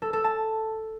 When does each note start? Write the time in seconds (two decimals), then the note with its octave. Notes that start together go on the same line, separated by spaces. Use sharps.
0.02 A4
0.13 A4
0.24 A5